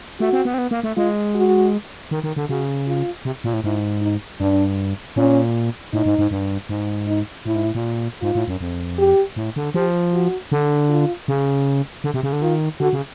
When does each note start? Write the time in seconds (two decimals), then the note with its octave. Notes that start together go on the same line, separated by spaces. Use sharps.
0.20 A3 F#4
0.33 C4
0.45 B3
0.54 C4
0.58 B3
0.71 A#3
0.83 A3
0.97 G#3 F4
1.35 F#4
2.11 D#3
2.23 D#3
2.36 D3
2.49 C#3 F#4
2.87 F4
3.25 C3
3.44 A#2
3.54 A2
3.64 G#2 E4
4.01 D#4
4.40 G2 D4
5.16 A#2 C#4
5.93 A2 D#4
6.06 G#2
6.19 G#2
6.31 G2
6.69 G#2
7.07 D#4
7.46 A2 E4
7.55 G#2
7.65 A2
7.75 A#2
8.22 G#2 F4
8.35 A2
8.48 F#2
8.61 F2
8.98 G4
9.36 A2
9.56 D3
9.74 F3 G4
10.13 F#4
10.52 D3
10.89 F4
11.28 C#3
12.04 D3
12.14 C3
12.23 C#3
12.33 D3
12.42 D#3 F4
12.80 D3 F#4
12.93 C#3